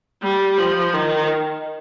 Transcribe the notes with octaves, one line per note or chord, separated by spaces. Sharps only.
G3
F3
D#3